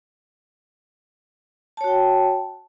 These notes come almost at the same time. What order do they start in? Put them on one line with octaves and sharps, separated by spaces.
A5 C#5 F#4 G5